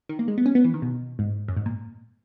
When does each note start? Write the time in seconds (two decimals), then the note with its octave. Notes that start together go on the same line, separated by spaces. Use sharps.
0.09 D#3
0.19 A#3
0.28 G#3
0.38 B3
0.46 C#4
0.55 B3
0.64 E3
0.74 D#3
0.82 B2
1.19 G#2
1.48 F#2
1.57 G#2
1.66 A#2